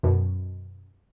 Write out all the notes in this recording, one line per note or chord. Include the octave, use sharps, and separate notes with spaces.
F#2 B2